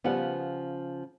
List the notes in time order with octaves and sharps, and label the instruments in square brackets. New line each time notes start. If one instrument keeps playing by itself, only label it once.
[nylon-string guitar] C#3 F3 F#5 [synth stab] G3 B3